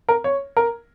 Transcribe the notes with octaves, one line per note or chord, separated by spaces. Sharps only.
A#4
C#5
A#4